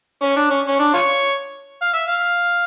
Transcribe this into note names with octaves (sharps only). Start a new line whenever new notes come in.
C#4
D4
C#4
C#4
D4
F4 C#5
F5
E5
F5